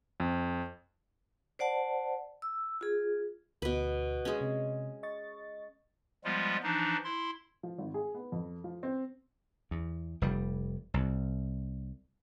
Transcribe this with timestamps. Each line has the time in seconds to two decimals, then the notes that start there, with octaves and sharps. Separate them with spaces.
0.20 F2
1.59 C5 D5 F#5 A5
2.42 E6
2.81 F4 G#4
3.62 D2 B2 B4
4.25 G#3 C#4
4.41 C3
5.03 D#5 C#6 A6
6.24 F3 G3 G#3 B3 F4
6.63 E3 F3 D4 D#4
7.04 E4 C6
7.63 F3
7.78 G#1
7.94 G#4
8.15 B3
8.32 F2
8.64 F3
8.83 C4
9.71 E2
10.22 F1 G3
10.94 C2